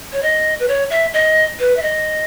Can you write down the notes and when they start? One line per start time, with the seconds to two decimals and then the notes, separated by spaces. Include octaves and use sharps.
0.13 C#5
0.23 D#5
0.60 B4
0.68 C#5
0.90 E5
1.14 D#5
1.60 B4
1.77 E5
1.82 D#5